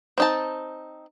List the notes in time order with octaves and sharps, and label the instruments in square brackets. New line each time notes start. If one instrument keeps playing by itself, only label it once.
[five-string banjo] C4 D#4 A5